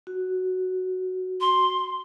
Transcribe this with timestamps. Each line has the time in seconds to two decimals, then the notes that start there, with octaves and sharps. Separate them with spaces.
0.07 F#4
1.41 C6